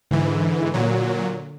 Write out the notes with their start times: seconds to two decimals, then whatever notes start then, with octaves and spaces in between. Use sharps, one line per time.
0.11 G#2 D3 E3
0.74 A#2 F#3